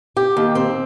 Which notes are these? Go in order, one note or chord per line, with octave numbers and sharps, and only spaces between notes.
G4
D#2
C4